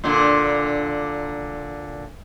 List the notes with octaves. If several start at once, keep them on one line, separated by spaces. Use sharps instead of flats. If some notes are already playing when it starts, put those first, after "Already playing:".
A#2 D3